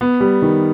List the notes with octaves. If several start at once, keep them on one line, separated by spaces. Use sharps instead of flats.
B3
G3
D#3